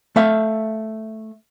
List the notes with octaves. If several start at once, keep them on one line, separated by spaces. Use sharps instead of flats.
A3 E5 F5